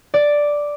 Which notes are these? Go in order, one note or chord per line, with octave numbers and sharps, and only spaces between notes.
D5